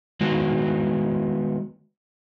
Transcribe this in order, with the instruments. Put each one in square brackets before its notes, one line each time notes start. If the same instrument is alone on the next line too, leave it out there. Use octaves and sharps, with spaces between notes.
[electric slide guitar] D#3 G#3 B3 F#4